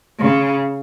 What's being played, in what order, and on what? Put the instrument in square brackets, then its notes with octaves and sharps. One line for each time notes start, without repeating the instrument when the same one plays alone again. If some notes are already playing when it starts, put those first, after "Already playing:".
[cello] C#3